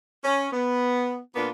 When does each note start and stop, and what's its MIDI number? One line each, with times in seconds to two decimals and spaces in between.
0.24 0.46 61
0.53 1.18 59
1.35 1.49 46
1.35 1.49 58
1.35 1.49 59
1.35 1.49 62
1.35 1.49 65